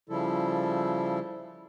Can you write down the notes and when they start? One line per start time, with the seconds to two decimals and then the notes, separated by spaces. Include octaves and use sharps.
0.09 C#3 F3 G3 E4 A4